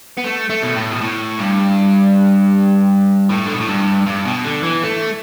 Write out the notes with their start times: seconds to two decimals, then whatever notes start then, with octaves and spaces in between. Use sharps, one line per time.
0.17 B3
0.24 A3
0.50 A3
0.63 B2
0.76 A2
0.91 B2
1.01 A2
1.39 G2
3.30 A2
3.46 D3
3.53 B2
3.60 A2
3.68 G2
4.06 G2
4.25 B2
4.45 D3
4.63 E3
4.83 A3